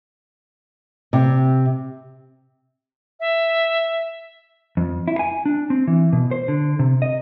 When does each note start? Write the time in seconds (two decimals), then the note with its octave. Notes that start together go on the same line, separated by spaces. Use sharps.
1.13 C3
3.20 E5
4.77 F2
5.08 E4
5.19 G#5
5.46 D4
5.70 C4
5.88 E3
6.13 B2
6.31 C5
6.48 D3
6.79 C3
7.02 D#5